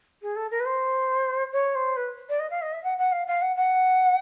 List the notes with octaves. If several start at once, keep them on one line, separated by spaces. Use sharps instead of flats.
G#4
A4
A#4
B4
C5
C#5
C5
B4
D5
D#5
F5
D#5
E5
F#5
F#5
F5
F5
F#5
F#5